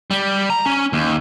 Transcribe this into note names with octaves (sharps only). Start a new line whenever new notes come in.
G3
A#5
C#4
D#2